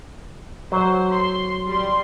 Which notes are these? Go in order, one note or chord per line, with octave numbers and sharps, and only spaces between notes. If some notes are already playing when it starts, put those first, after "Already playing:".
F#3 C5
C6
G3 C6